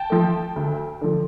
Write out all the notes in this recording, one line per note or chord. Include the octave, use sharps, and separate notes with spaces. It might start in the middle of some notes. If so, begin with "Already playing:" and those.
Already playing: G5 A5
F3 A3
D2
D3 F3